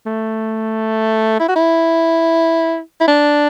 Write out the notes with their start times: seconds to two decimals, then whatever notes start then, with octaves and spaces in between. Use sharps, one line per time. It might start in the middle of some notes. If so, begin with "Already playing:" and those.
0.06 A3
1.40 E4
1.49 F#4
1.56 E4
3.01 E4
3.08 D4